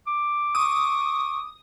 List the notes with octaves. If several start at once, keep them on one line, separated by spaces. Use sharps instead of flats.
D6
C#6 D#6